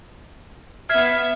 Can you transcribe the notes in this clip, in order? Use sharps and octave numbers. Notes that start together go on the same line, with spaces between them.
B3 E5 F6 G#6 C7